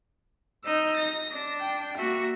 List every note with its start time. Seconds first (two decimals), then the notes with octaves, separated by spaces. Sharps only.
0.65 D#4 E6 G6
0.97 A#6
1.32 D4
1.61 G5
1.97 A#3 F#4 E5